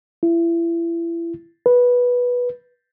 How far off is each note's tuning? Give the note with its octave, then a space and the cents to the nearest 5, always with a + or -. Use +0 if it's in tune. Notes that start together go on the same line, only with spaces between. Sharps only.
E4 +30
B4 -10